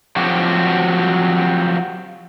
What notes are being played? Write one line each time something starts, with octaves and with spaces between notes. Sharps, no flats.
F3 F#3 C4 F#4 G4